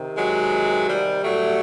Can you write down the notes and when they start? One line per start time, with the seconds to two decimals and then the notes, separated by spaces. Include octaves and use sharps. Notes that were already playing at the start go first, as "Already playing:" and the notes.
Already playing: C3 D#3
0.18 F#3 G#3
0.89 G3
1.23 A2 F#3 G3 A3